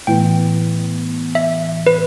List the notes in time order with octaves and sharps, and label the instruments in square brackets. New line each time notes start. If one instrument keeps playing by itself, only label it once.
[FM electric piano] A2 E3 B3 [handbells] G5
[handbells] E5
B4